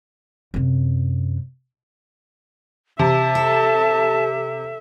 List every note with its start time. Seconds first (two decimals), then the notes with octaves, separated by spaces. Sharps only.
0.54 F#2 C3
2.99 C3 E5 A5
3.35 A4